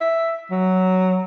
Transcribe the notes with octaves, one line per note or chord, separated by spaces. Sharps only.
E5
F#3